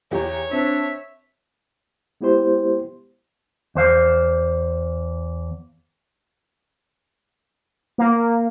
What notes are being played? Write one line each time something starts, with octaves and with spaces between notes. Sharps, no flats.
E2 G4 C#5 A#5
C4 D4 E5
G#3 B3 E4 G4 C5 C6
E2 C5 F5
A#3